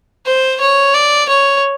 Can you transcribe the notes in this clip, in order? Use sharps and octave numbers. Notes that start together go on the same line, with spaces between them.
C5
C#5
D5
C#5